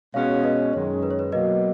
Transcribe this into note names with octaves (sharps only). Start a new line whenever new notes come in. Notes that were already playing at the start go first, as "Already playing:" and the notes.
B2 G#3 C#4 C#5 F5
B4 D#5
F#2 D#3 G#3 C#5
B4
C#5
B4
B2 F#3 A#3 B4 D#5